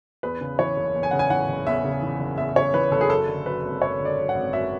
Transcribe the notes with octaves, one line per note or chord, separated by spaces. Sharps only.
E2 B4
C#3
E3 C#5
F#1
E2
G#5
C#3 F#5
G#5
E3 F#5
F#1
E2 E5
C#3
E3
F#1
E2 E5
C#3 C#5
E3 B4
F#1 A4
G#4
F#2 A4
D3
F#3 B4
G#1
F#2 C#5
D3
D5
F#3
F#5
G#1
F#2 E5